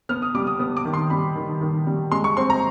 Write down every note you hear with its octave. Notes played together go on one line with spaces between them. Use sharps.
B3 F6
D#6
G3 D6
D#6
B3 D#6
D6
D#3
C6
G3 B5
D#3
D#3
G3
G#3 C6
C#6
C4 C6
A#5